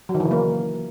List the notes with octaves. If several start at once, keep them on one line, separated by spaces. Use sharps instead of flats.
F#3
D#3
E3
C#3
A#3